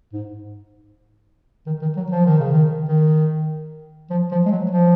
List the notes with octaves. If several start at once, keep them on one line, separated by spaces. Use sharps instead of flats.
G#2
D#3
D#3
F#3
F3
D#3
C#3
D#3
D#3
F3
F3
G#3
F#3
F3